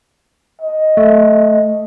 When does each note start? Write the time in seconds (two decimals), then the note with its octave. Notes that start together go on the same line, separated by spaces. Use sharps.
0.62 D#5
0.97 A3